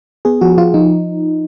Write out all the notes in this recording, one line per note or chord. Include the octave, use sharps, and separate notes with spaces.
B3 G#4
F3 F#4
F3 F4
F3 D#4